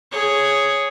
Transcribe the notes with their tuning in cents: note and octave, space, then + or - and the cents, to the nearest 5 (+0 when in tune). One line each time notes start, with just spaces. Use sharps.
G#4 +0 C#5 +0